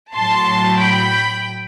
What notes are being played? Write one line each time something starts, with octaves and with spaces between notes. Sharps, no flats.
A2 F#3 A5 C6
G5 B5